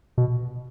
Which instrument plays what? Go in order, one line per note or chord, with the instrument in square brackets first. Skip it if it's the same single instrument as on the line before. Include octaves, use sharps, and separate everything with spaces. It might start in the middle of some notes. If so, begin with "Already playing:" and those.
[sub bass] B2